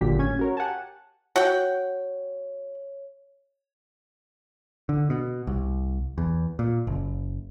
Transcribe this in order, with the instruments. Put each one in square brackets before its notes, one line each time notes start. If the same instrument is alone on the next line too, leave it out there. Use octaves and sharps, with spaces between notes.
[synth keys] G#1 A#2 D3 F#3 G4 B6
A1 C#4 G#6
F#4 A#4 C#5
G4 F#5 G#5 A5
[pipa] F#4 F#5 G5 [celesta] C#5
[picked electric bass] D3
B2
C2
E2
A#2
F#1